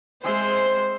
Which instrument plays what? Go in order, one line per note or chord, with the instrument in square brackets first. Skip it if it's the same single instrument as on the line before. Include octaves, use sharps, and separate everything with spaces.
[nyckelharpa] G#3 C6 [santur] C4 G#4 E5 [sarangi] C5